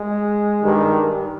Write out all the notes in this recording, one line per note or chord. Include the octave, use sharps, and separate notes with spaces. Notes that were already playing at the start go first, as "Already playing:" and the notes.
Already playing: G#3
G2 D#3 G3